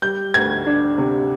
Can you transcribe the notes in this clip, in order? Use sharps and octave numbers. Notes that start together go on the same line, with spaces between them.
G3 G6
D2 G#6
D4
C3